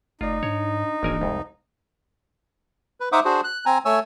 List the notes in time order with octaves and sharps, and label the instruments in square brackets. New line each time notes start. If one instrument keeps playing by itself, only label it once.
[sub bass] F#1 [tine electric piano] A3 D5 [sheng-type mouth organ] D#4 [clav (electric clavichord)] F4
[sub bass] G#2 [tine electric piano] D4 [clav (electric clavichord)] C#5
[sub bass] D1 [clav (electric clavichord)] G#1 A#4 G#5 [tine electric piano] E3 A#3 D4
[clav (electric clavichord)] C2 F2 [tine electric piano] G#3
[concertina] B4
D#4 C5 E5 F#5 D6 D#6
D4 F#4 G#4 C5
F#6
C4 G#5 A#5
A3 C#5 G#5 E6